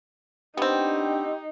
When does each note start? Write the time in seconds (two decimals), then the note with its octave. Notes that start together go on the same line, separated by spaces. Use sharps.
0.57 B3 C4 D4 D#4 G4